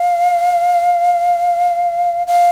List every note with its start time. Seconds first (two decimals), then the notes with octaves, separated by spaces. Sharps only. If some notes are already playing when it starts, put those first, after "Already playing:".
Already playing: F5
2.27 F5